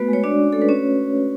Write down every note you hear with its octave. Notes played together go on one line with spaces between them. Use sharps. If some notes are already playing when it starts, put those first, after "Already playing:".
Already playing: A3 B3 F#4 B4
G#3
C#5
D4 F#4 D5
C#4
A3 A4
B4
C#4 F#4 C#5